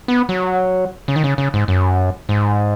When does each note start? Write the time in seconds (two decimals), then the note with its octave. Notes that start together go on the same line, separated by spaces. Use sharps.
0.08 B3
0.29 F#3
1.08 C#3
1.16 D#3
1.24 C#3
1.38 C#3
1.54 G#2
1.68 F#2
2.29 G#2